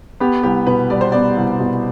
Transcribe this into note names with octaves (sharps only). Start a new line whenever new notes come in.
B3 G4
C2 G4
B2 B4
G3 D5
C5
B3 D5
C2
B2